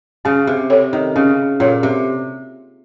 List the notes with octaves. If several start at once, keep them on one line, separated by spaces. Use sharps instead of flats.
C#3 C#4
C3
A4 C#5
D#3
C#3 C#4
A#2 A4 C#5
C3